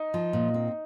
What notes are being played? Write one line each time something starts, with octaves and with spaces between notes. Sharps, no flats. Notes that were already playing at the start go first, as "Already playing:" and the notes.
Already playing: D#4
F3
A#2
C4